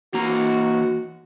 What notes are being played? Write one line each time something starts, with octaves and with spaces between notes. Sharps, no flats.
E3 A#3 F#4 A#5